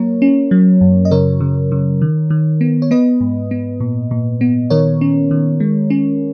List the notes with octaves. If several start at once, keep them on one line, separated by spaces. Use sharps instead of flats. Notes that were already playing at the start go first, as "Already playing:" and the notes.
Already playing: F#3 A#3 A#4 C#5
C#4
F#3
F#2
D#5
C#3 A#4 C#5
C#3
C#3
D#3
D#3
B3
C#5
B3 B4 D#5
G#2
B3
A#2
A#2
B3
D#3 A#4 C#5
C#4
D#3
G#3
C#4